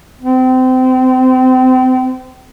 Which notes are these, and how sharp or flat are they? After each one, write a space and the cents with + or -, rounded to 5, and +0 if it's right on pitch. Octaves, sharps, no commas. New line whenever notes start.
C4 -30